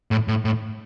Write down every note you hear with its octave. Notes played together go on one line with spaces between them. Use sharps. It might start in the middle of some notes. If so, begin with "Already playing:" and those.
A2
A2
A2